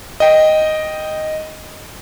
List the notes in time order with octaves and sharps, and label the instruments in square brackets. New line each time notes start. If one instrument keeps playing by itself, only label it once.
[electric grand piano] D#5 G5